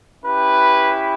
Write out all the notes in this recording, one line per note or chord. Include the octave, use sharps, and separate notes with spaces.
C#4 E4 G4 B4